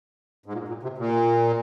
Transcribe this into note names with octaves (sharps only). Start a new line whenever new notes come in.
G#2
A#2
A#2
C3
A#2